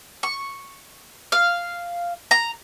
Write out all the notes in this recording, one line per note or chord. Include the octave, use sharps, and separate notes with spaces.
C#6
F5
A#5